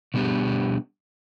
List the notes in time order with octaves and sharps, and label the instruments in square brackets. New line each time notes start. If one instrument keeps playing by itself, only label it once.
[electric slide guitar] B2 G3 B3 D4 G4